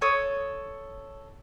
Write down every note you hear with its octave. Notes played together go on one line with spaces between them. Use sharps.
A4 C#5 D#6